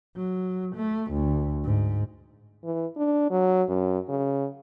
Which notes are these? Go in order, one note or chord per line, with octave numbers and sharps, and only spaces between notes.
F#3
A3
D2
G#2
E3
D4
F#3
F#2
C#3